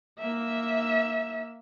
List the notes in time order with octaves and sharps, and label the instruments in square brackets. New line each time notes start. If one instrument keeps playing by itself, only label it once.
[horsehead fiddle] A#3 E5